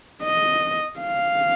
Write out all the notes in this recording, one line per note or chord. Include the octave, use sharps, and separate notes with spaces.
D#5
F5